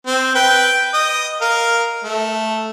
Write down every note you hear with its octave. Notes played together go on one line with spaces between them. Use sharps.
C4
B4 G5
D#5
A#4 F5
A3